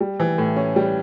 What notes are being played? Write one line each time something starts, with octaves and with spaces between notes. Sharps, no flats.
G3
E3
A2
C#4
G3